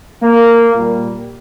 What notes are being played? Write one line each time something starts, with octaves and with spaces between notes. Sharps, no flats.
A#3
A#2 G3